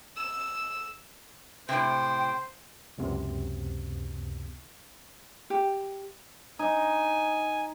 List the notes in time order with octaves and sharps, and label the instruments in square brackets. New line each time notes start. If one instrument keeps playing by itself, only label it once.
[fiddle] E6
[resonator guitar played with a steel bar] A2 C3 [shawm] C5 [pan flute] G5
[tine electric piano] C#2 F#2 C3 B3
[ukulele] G4
[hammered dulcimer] D#4 [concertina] G#5